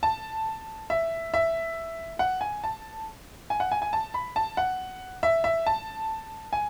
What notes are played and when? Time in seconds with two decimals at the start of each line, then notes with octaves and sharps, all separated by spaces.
0.03 A5
0.90 E5
1.34 E5
2.19 F#5
2.41 G#5
2.64 A5
3.50 G#5
3.60 F#5
3.72 G#5
3.82 G#5
3.93 A5
4.14 B5
4.36 A5
4.57 F#5
5.23 E5
5.44 E5
5.66 A5
6.53 G#5